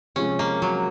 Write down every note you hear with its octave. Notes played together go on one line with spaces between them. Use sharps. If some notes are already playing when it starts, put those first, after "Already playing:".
C3 F3 G#3 C#4
A#3
F#3